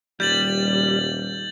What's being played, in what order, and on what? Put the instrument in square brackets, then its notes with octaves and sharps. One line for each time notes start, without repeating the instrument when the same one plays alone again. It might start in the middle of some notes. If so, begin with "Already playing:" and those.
[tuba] D#1 [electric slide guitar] G3 [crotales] G6 A6 F#7